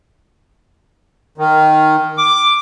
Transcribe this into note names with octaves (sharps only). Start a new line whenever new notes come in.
D#3
D6